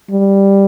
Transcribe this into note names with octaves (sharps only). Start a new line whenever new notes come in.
G3